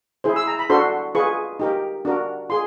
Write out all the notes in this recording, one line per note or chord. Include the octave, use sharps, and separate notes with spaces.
E4 G#4 C5
E6
A#5
B5
D4 F#4 A4 C5 C6
F4 G#4 B4 C#6
D#4 G4 A#4
D4 F#4 A#4
F4 G#4 C6